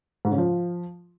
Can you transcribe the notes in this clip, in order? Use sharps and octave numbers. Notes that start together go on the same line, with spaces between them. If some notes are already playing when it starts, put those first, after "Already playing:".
G#2
C#3
F3